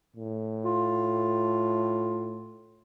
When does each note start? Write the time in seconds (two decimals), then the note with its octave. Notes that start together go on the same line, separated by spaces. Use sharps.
0.17 A2
0.65 F4